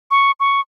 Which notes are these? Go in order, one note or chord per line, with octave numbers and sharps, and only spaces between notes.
C#6
C#6